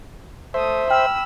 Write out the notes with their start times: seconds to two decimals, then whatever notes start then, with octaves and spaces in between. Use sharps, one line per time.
0.54 A3 C5 E5 D#6
0.90 G5 B5 E6 F6